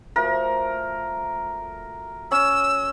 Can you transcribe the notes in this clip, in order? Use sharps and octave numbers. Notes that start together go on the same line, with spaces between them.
F3 A3 F#4 A#4
C#4 E6